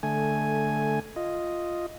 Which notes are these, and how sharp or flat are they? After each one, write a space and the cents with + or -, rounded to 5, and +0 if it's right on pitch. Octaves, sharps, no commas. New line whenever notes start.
D3 +0 A3 -10 G#5 +0
F4 +0 D#5 +0